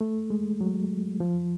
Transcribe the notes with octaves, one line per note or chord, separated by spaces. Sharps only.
A3
G#3
F#3
F3